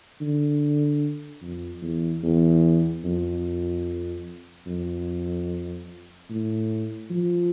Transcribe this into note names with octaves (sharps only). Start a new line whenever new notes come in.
D3
F2
E2
E2
F2
F2
A2
F3